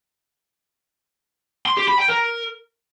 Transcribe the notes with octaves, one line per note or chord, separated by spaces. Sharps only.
C6
G4
B5
G5
A#4